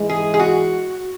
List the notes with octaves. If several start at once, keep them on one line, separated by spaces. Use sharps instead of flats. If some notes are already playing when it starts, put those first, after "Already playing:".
Already playing: G#2 E3 G#3
G#4
G#4
F#4